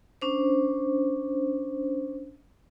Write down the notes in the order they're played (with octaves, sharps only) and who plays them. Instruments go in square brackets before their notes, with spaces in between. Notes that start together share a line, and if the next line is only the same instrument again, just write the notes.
[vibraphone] C#4 D4 C5